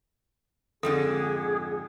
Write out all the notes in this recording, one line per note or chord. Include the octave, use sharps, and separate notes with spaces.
F2 G#2 D3 G#4 A4